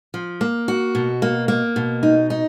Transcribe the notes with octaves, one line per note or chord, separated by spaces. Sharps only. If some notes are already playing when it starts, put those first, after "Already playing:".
F3
A#3
F#4
B2
A#3
A#3
B2
D#4
D#4